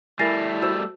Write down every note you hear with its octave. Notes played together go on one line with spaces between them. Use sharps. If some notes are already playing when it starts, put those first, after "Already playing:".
G3 A3 E4 A#4 G#5 A6 A#6 C7
F#4 C5 A5 E6